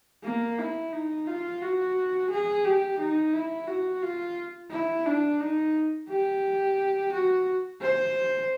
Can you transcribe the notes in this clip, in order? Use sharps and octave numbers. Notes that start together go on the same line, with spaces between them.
A#3
E4
D#4
F4
F#4
G#4
G4
D#4
E4
F#4
F4
E4
D4
D#4
G4
F#4
C5